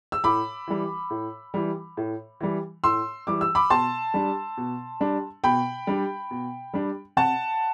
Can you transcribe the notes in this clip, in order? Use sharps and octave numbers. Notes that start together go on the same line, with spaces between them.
E6
A2 B5 D6
E3 G3
A2
E3 G3
A2
E3 G3
A2 C6 E6
E3 G3 D6
E6
B5 D6
B2 A5 C6
G3 D4
B2
G3 D4
B2 G5 B5
G3 D4
B2
G3 D4
C3 F#5 A5